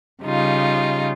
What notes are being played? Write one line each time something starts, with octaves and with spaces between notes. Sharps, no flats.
C#3 G3 D#4 F4